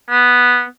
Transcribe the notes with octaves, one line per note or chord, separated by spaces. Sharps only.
B3